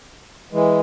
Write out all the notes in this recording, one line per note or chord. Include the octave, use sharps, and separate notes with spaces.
E3 G#3